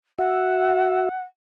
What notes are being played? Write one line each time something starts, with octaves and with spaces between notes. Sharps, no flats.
F#4 E5 F#5